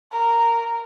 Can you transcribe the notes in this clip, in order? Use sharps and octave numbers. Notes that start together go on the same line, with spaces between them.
A#4